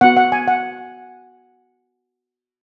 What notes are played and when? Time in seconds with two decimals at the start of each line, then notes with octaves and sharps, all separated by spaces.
0.01 B3 F#4 F#5
0.17 F#5
0.32 G#5
0.48 F#5